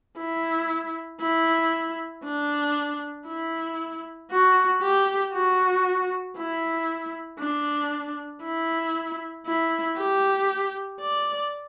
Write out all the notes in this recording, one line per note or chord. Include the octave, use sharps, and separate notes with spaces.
E4
E4
D4
E4
F#4
G4
F#4
E4
D4
E4
E4
G4
D5